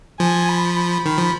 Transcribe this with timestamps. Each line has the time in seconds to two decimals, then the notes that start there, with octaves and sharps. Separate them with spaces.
0.20 F3 G#5
0.49 B5
1.06 D#3
1.18 F3